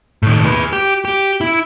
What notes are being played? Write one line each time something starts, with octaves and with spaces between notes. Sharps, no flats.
A2 D#3
G#4 B4
G4
G4
E4